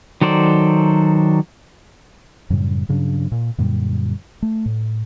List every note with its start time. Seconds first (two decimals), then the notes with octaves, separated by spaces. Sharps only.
0.21 D#3 F#3 A4 C5 D5
2.50 F#2 A2 C#3 G3
2.89 G2 C#3 F#3 D4
3.32 A#2
3.58 F#2 A#2 D3 G3
4.42 A3
4.66 A2